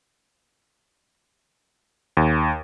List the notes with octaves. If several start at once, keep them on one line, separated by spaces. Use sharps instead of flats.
D#2